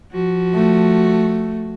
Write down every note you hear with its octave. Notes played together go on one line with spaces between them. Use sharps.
F3 F#4
A3